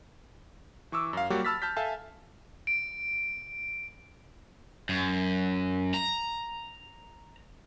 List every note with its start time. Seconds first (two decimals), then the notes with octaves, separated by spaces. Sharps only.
0.92 E3 C#6 D6 E6
1.13 F#2 F5
1.30 F#3 G3 A#3 F#4 G4
1.45 A5 B5 E6 F6 A6 B6
1.62 A5 F6 G6 B6
1.76 A4 E5 F5 G#5 A5
2.67 D7
4.89 F#2
5.94 A#5